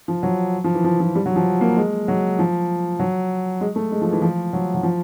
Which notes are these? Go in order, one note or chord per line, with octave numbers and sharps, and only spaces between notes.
F3
F#3
F3
E3
F3
F3
G3
F#3
F3
A#3
G#3
F#3
F3
F#3
G#3
A3
G#3
F3
E3
F3
F#3
F#3
F3